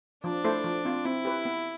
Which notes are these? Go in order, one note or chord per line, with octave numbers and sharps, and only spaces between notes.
F3 D4
A3 E4 A4 C5
F3
C4 F4
C4 E4
G4 B4
B3